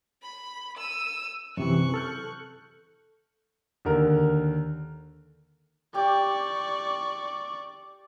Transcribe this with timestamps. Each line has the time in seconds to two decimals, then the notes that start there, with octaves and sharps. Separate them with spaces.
0.23 B5
0.77 E6 D#7
1.57 F#2 C3 E3 C#6 F#6
1.94 A4 F6 G6
3.85 D#2 D3 A#4
5.94 G4 D5 G5 C#6